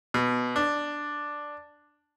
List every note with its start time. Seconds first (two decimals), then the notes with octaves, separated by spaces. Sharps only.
0.14 B2
0.56 D4